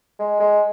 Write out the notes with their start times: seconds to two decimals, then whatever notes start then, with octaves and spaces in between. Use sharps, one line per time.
0.19 G#3
0.40 G#3